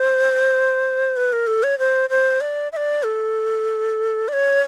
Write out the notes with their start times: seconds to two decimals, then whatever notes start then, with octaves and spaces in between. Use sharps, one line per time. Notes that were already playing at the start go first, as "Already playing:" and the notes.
Already playing: C5
1.17 B4
1.33 A#4
1.47 A4
1.63 C#5
1.79 C5
2.10 C5
2.41 D5
2.72 E5
2.77 D5
3.03 A4
4.28 D5
4.33 C#5